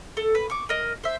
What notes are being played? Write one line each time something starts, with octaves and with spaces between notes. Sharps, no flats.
A4
B4
C#6 D6
A#4 D#5
C5 E5